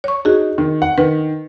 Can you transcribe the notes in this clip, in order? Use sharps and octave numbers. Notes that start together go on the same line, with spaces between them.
C#5 C#6
D#4 F#4 G#4
D#3
F#5
D#3 B4